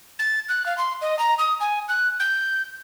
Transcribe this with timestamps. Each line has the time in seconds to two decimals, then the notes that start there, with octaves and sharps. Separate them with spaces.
0.19 A6
0.49 F#6
0.66 F5
0.78 C6
1.01 D#5
1.19 A#5
1.38 D#6
1.60 G#5
1.88 F#6
2.20 G6